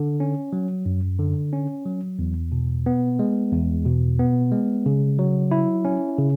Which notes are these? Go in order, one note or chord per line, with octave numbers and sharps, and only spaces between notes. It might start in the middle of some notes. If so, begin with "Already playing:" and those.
Already playing: D3
C#4
F#3
F#2
D3
C#4
F#3
E2
B2
B3
G#3
E2
B2
B3
G#3
C#3
F#3
E4
C#4
C#3